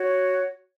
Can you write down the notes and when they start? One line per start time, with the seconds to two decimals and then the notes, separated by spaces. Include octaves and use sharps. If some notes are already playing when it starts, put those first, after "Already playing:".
Already playing: F#4 C#5